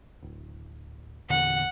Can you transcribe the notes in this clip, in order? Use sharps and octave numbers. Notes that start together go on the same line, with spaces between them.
D1
E2 A#2 D3 F#5